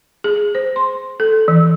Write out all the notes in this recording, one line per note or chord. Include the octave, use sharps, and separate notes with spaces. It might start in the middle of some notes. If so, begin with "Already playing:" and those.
G#4
C5
C6
A4
E3